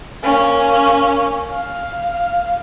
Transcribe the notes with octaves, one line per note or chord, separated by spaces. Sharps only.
A#3 C#4
F5